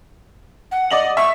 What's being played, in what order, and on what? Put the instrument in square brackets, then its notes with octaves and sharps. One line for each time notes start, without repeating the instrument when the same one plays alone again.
[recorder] F#5
[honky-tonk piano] D5 D#5 F#7
[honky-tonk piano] E5 [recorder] C#6